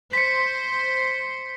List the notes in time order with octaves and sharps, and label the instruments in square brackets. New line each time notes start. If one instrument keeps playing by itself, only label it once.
[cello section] C5 [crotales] B6 C#7